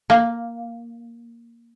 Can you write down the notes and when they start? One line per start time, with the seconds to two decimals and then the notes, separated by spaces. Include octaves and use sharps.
0.10 A#3